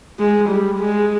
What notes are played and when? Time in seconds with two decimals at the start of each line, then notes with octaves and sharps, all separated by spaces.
0.20 G#3
0.49 G3
0.79 G#3